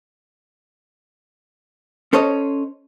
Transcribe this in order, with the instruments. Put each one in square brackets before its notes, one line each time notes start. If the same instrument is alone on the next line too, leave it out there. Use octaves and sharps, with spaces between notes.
[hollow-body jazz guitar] C#4 A4 C5 C#5 D#5